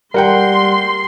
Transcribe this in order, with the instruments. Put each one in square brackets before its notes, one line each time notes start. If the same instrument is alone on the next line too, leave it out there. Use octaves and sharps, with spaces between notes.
[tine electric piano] G3 F#5 [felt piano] A#4 G5 [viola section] C6